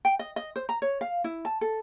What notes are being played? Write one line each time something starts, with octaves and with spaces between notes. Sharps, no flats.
G5
D#5
D#5
C5
A#5
C#5
F5
E4
A5
A4